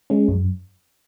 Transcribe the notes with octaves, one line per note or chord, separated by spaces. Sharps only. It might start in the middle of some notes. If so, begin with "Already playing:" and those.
G#3 C#4
F#2